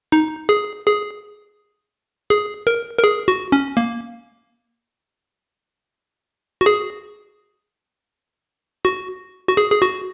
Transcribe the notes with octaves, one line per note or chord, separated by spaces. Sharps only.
D#4
G#4
G#4
G#4
A#4
A#4
G#4
F#4
C#4
A#3
F#4
G#4
F#4
F#4
G#4
G#4
F#4